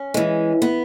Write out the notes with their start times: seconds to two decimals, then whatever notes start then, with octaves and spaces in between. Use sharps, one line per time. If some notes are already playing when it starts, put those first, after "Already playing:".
Already playing: C#4
0.14 E3 G#3
0.62 B3